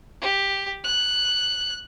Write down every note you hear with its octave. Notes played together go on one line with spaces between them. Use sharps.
G4
F#6